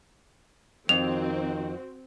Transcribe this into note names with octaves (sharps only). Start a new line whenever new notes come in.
F2 D#3 C4 F#4 F7